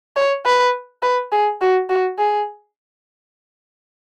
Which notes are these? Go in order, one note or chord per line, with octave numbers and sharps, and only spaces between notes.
C#5
B4
B4
G#4
F#4
F#4
G#4